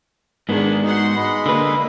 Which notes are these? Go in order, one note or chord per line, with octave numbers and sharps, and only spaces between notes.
G#2 D#3 B3 D4 G#4
D#4 F#4 F#5 C6
G#3 D#5 B5
D3 A#3 B4